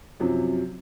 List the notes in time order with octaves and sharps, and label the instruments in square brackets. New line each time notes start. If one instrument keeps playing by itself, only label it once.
[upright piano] F#2 C3 F3 F#3